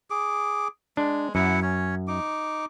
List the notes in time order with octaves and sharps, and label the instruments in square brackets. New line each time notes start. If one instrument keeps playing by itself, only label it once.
[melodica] G#4 D6
[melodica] G#3 [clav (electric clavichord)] D4
[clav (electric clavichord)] F#2 [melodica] E4 F#5
[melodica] C#4 C#5
D#4 D6